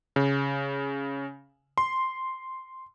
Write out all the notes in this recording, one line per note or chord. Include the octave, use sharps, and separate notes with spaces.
C#3
C6